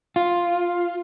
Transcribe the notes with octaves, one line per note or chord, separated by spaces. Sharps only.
F4